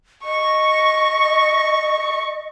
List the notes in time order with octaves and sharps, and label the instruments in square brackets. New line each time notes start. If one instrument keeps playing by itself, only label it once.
[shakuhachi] D#5 [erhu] C#6